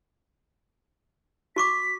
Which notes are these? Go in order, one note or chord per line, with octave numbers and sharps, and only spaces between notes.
F#4 C#6 D6 B6